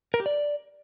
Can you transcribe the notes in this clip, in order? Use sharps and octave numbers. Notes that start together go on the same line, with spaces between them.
A#4
G4
D5